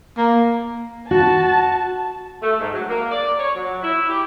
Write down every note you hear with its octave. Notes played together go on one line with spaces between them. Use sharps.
A#3
F#4 A5
A3
G#2
F#3
A#3
D5
C#5
F#3
E4
G4